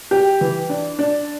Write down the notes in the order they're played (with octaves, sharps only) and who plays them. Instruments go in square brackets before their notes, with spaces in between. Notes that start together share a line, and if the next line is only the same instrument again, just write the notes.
[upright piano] G4
E3
D4
D4